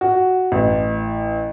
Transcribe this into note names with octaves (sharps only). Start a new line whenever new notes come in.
F#4
A1